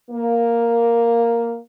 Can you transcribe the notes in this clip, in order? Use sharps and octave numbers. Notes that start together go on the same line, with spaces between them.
A#3